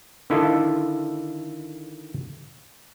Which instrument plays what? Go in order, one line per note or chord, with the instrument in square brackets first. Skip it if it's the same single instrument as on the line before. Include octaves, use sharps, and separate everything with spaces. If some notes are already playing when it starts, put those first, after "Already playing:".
[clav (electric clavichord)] D3 D#3 E4 F4 A4 D#5